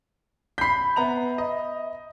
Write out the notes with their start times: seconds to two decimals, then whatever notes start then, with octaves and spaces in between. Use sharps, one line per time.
0.58 B5 G6 B6 C7
0.96 B3 E5 A#5 F7
1.38 D#5